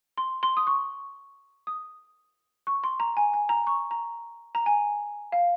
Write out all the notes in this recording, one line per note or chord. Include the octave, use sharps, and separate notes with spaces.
C6
C6
D#6
C#6
D#6
C#6
C6
A#5
G#5
G#5
A#5
C#6
A#5
A#5
G#5
F5